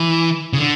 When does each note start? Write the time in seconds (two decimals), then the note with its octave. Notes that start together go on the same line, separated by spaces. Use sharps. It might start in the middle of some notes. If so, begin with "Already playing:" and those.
Already playing: E3
0.53 C#3
0.58 D3